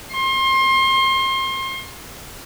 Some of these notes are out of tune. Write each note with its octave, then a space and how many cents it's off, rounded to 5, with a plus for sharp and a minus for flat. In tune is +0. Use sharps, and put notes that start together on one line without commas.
C6 +30